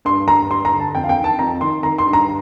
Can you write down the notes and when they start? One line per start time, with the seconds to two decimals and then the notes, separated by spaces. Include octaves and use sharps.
0.05 G2 C6
0.28 G2 A#5
0.50 G2 C6
0.65 A#5
0.72 D3
0.79 A5
0.95 F2 G5
1.04 F5
1.09 G5
1.18 D#3
1.24 A5
1.39 F2 A#5
1.61 D#3 C6
1.83 D#3 A#5
1.98 C6
2.06 G2
2.13 A#5